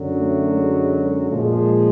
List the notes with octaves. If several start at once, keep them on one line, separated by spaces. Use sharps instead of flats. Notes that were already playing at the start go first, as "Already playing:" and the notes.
Already playing: F#2 D3 F#3
A3
G#3
A#2 F3 G#3